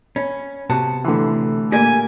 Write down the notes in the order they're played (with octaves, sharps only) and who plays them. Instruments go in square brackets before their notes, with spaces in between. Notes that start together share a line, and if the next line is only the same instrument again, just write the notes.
[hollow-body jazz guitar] C#4 [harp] B5
[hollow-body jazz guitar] C3 B3 F#4 [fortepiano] A5
[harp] A2 B5 C6 [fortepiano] D3 E3
[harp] A#2 [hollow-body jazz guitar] G4 A#4 D5 [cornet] G#5